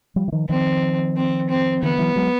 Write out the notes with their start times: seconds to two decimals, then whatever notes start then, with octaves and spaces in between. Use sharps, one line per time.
0.16 F3 G3
0.28 E3
0.32 D#3 F3
0.49 D#3 F3 C4
1.16 C4
1.49 C4
1.82 D3 E3 B3
1.99 E3 F#3
2.15 F#3 G#3